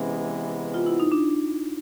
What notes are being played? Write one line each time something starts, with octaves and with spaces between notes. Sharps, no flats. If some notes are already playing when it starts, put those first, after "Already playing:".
Already playing: C3 E3 G#3 B3 C#4
F4
E4
D#4
D4